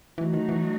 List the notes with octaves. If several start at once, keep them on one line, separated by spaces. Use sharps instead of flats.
E3 F#3 A3 D#4 F#4
D#3
E3